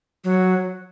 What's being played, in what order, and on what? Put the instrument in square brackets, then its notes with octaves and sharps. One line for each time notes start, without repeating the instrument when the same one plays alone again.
[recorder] F#3